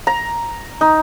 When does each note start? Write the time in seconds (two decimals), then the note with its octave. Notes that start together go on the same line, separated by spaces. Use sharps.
0.07 A#5
0.81 D#4